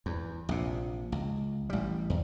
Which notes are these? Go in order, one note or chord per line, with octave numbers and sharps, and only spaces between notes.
E2
A#1 C3
C#2
A1 G3
E2